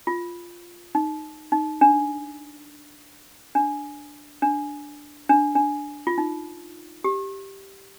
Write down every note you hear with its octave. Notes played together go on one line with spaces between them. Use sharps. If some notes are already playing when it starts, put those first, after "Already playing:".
F4
D#4
D#4
D4
D4
D4
D4
D4
F4
D#4
G4